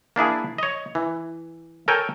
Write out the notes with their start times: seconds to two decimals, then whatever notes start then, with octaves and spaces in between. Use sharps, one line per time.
0.16 A#3 D4 E4 G#4
0.58 C#5 D#5
0.95 E3
1.88 A4 A#4 C#5 G5 G#5